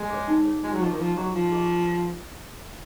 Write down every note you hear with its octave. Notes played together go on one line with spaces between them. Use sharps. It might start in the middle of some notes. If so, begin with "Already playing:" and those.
Already playing: G#3
G#4 C#5
D#4
G#4 C#5
G#3 F4
F#3
F3 G#4 D#5 A#5 C#6
D#3
F3 F4
F#3 G#4 D#5 A#5 C#6
F3 F4
G#4 D#5 A#5 C#6